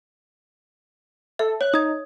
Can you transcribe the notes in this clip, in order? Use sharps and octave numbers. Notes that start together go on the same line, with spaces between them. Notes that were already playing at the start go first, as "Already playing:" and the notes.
A4 E5
C#5 F#6
D#4 D#6 G#6